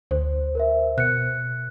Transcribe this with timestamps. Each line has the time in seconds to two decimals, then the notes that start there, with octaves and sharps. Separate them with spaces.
0.11 D2 C5
0.55 A#4 C5 E5
0.98 B2 F#6 C#7